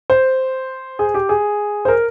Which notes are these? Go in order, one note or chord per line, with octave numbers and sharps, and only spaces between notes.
C5
G#4
G4
G#4
C5
A#4